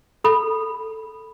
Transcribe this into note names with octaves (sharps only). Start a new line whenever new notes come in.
A4 B5